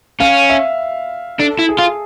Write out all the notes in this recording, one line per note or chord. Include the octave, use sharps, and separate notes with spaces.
C#4 F5
E5
D4 A4
E4
G#4
F4